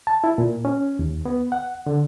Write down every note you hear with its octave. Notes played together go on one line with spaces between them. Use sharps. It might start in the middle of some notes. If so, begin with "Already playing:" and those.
A5
E4
A#2
C#4
D#2
B3
F#5
D3